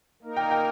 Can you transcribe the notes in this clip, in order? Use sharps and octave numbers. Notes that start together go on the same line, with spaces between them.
A#3 D#4 A#4
G5
G5